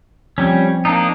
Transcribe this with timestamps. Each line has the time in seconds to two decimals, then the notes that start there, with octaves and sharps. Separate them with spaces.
0.38 F3 G3 C4 C#4
0.85 A#3 D4 D#4